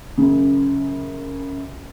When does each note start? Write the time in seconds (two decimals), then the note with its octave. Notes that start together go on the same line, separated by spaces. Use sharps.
0.18 F#2 C#3